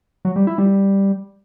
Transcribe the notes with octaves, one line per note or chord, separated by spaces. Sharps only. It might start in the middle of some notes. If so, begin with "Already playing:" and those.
F#3
G3
E4
G3